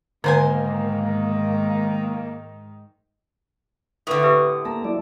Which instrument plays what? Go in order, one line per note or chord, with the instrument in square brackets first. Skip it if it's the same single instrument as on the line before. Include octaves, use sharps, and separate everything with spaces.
[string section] G#2 D#3 [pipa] B2 C5 G#5 [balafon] D3 [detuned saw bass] A#3
[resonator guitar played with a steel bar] A2 D3 [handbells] B4 C#6 D#6
[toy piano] G4 B4 E5 [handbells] D#6
[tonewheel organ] A#3 A#5 [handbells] A5
[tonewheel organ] F#3 E4 D5